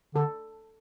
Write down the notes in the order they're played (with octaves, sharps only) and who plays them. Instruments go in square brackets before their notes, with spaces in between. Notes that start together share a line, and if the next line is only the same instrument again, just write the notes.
[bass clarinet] D3 [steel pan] A4